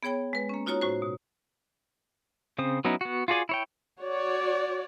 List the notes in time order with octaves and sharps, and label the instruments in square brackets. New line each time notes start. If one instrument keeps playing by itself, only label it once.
[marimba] B3 G#4 C#5 G5 B5
G#3 B4
A#3 C#4
D#4 F4 F#4 C#5 A#5 D#6
A2 F#4 C5
B2
[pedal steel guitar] C#3 C4 C5 D#6
F#3 B3 C#4 D#4 E4
B3 F#4
F4 F#4 G#4 D5 G#5
E4 C#5 G5
[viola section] F#4 C#5 D5